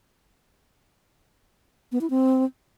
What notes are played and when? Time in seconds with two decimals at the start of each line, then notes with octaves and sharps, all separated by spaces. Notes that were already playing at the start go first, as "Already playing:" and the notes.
1.92 B3
2.01 E4
2.10 C4